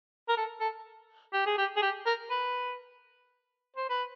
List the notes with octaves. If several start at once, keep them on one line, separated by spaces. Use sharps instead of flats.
A#4
A4
A4
G4
G#4
G4
G#4
G4
A#4
B4
C5
B4